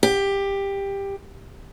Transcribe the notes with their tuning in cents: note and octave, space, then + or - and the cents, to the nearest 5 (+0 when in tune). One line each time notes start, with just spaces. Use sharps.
G4 +15